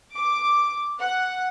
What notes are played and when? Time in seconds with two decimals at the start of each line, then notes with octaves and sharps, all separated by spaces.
0.14 D6
1.00 F#5